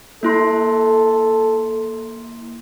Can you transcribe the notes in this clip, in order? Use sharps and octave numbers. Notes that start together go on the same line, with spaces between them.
A#3 E4 A4 C6